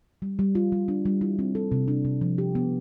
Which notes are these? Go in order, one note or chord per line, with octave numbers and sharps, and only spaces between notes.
G3
G3
F4
G3
D4
G3
E4
C4
A4
C3
D4
C3
F3
G4
B3